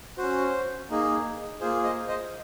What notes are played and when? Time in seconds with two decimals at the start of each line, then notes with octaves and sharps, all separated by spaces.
0.18 C#4 F#4 C5
0.90 A#3 D#4 G#4
1.60 A#3 F4 G#4 C5
1.84 C5 D#5
2.08 C5 D#5